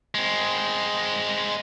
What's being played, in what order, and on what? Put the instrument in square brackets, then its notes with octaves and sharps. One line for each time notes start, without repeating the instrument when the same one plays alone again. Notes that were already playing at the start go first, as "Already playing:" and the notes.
[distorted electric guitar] G#3 C4